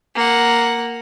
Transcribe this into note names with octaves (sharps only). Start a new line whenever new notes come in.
A#3 F#5